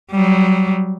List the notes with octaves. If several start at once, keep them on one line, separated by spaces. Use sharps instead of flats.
F#3 G3